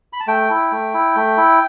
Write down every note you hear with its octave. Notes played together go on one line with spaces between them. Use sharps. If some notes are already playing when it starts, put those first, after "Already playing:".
B5
A5
A3 G5
E4
A3
E4
A3
E4